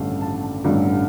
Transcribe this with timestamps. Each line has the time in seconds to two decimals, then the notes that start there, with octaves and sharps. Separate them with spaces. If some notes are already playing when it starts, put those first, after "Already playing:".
Already playing: A1 G2 D3 A3 F5
0.21 A5
0.64 A1 G2 D3 A3